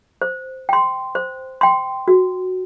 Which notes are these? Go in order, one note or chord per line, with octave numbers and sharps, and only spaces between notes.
C5
G5 C6
C5
G5 C6
F#4